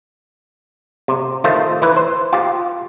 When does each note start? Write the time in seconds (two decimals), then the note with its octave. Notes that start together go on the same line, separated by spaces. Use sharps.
1.08 C3
1.44 D#3 A3 F4 C5
1.82 E3 E4 B4
1.96 C5
2.33 F4 G4